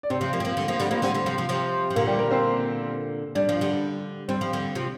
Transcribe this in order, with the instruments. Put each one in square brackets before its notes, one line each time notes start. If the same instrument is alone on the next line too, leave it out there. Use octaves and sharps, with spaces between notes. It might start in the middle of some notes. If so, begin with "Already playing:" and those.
[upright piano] D5
[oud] C3 [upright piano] C4 C5
[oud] C3 F3
F3 A#3
C4
F3 A#3
D3 G3
F3 A#3
D3 G3
F3 A#3
[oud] D3 G3 [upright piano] C4 C5
[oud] D3 G3
C3 F3
C3 F3
C3 F3
F3
[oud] A#2 D3 [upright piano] A#3 A#4
[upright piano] G3 G4
A#3 A#4
C4 C5
[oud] G3 [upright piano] D4 D5
[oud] F3
D3 G3
[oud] G3 [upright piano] C4 C5
[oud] F3
D3 G3
C3 F3